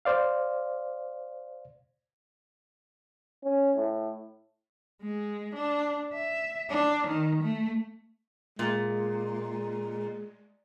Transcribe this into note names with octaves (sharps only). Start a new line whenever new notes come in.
C5 D5 F5
C#4
A2
G#3
D4
E5
D4
D#3
A3
A#2 G#3